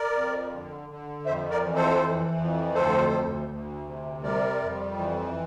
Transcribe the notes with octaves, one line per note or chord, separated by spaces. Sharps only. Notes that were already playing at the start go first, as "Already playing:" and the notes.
Already playing: A#4 D5
F2
D3
D3
F2 C5 E5
A#4 D5
E3
A4 C5
E3
F2
D2 A4 C5
D2
D2
C3
G3 A#4 D5
F2
E3